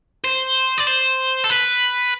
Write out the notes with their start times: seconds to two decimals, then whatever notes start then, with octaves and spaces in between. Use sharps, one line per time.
0.24 C5
0.78 D5
0.87 C5
1.44 A4
1.50 B4